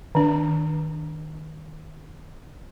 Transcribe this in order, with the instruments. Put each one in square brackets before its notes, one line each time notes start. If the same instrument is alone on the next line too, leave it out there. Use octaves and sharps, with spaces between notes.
[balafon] D#3 D4